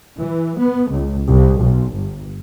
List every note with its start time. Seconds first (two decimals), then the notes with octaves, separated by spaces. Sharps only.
0.20 E3
0.59 B3
0.90 C#2
1.27 C2
1.60 B1
1.93 G1